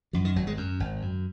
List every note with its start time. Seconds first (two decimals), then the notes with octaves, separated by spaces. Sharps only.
0.13 F#2 F3
0.25 D#3
0.36 G#1 F#3
0.47 G#3
0.57 F#2
0.80 G#1
1.02 F#2